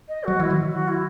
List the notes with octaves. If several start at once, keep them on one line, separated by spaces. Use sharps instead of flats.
D#5
F#3 F#4
E3 E4
D#3 F#3
F#4
E4